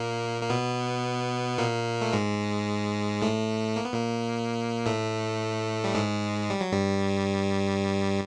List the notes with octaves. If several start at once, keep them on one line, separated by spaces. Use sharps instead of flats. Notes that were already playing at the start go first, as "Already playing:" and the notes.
Already playing: A#2 A#3
A#3
B2 B3
A#2 A#3
A3
G#2 G#3
A2 A3
A#3
B3
A#2 A#3
A2 A3
G3
G#2 G#3
G3
F#3
G2 G3